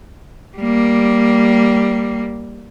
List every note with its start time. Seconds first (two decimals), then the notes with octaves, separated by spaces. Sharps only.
0.57 G3 A#3